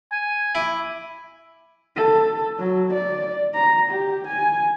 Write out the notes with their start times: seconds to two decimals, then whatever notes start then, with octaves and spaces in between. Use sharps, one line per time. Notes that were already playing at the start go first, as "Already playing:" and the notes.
0.12 G#5
0.55 E4 D6
1.96 A4
2.59 F#3
2.93 D5
3.54 A#5
3.90 G4
4.27 G#5